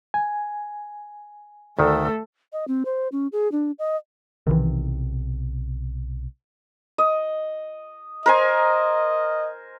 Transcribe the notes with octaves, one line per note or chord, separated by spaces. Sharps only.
G#5
D2 D#3 A3 A4
D#5
C4
C5
C#4
G#4
D4
D#5
B1 C3 D#3 E3
D#5
A#4 C5 D#5 G#5